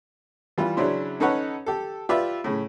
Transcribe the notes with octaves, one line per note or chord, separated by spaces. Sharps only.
E3 G3 F4
C#3 F#3 C#4 D4 E4 C5
C#4 D#4 A4 B4 C#5 F#5
G4 A4
F4 G4 B4 D5 E5
A2 C#3